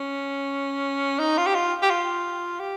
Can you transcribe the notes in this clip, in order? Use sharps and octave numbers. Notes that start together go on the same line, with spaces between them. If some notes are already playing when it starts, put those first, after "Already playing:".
Already playing: C#4
D#4
F4
G4
F4
G4
F4
G4